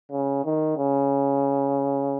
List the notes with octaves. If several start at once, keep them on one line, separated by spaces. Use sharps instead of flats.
C#3
D#3
C#3